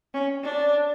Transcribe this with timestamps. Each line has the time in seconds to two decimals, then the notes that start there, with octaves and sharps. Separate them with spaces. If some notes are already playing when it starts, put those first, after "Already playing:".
0.14 C#4
0.44 D4